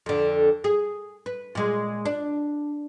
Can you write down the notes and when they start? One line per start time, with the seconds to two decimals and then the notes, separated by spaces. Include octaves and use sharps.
0.06 F2 D3
0.64 G#4
1.26 B4
1.55 A#2 G#3
2.06 D4